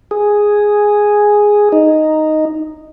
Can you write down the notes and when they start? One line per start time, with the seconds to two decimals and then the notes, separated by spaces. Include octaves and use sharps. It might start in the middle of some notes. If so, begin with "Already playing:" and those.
0.11 G#4
1.72 D#4